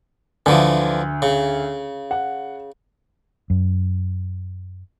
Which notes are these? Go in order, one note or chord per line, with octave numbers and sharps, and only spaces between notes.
D2 D3 E3 F3
C#3
F#5
F#2